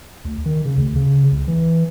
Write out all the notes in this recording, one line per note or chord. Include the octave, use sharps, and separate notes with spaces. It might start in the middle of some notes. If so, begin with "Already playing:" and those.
D2
D#3
C#3
D2
C#3
C#2
E3